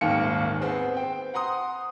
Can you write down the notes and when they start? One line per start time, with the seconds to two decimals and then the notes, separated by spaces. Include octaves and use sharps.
0.01 D#1 G#1 D#2 A#3 G5 C#7
0.60 B3 C4 G#4 C5
0.94 C4 G5
1.34 F#5 A#5 C6 D#6